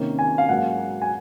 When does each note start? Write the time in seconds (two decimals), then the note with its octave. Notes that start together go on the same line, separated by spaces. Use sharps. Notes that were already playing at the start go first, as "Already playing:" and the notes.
Already playing: C3 D#3 A#3 C#4
0.19 G#5
0.38 F5
0.49 G#2 F#3 A#3 F#5
1.02 G#5